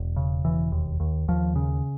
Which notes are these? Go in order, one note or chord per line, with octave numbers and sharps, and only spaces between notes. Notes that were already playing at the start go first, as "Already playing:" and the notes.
Already playing: E1
C#3
E1 E3
D#2
D#2
D#2 F3
C#3